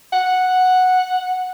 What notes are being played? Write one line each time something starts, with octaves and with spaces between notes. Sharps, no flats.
F#5